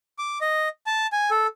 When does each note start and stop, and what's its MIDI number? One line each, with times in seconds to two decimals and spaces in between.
0.19 0.38 86
0.41 0.69 75
0.87 1.07 81
1.12 1.30 80
1.31 1.47 69